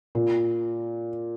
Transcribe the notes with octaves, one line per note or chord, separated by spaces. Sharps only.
A#2